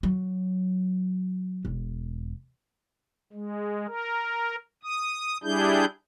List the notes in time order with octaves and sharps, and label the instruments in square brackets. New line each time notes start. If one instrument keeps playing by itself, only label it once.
[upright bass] F#3
E1
[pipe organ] G#3
A#4
D#6
G3 D4 E4 G#4 G6